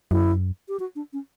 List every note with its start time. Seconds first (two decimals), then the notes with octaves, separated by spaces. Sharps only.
0.11 F#2 E4
0.68 G4
0.80 F#4
0.96 D4
1.13 C#4